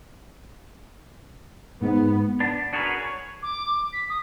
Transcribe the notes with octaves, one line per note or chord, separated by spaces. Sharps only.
G#2 B3
B3 D4
D4 F#4 G#4 A#4 B4
C#5
D6
B6
D#6